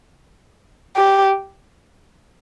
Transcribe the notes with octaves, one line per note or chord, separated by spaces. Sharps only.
G4